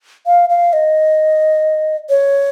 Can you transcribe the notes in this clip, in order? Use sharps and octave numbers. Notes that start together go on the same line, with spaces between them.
F5
F5
D#5
C#5